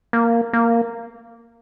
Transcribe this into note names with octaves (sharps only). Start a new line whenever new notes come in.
A#3
A#3